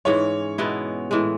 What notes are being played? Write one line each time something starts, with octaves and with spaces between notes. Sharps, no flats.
G#2 E3 G#3 C#4 C#5
B2 G#3 B3 E4
A2 E3 G#3